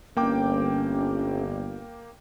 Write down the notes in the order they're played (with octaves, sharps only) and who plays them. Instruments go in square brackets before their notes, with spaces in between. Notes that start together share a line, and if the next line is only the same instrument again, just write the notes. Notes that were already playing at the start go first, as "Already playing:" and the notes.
[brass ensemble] G1 [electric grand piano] A#3 G5 D6 [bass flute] C#4